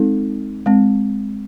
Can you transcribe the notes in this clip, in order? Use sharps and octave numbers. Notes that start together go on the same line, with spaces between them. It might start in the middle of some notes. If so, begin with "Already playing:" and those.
Already playing: G#3 C4 D#4 A4
G#3 C4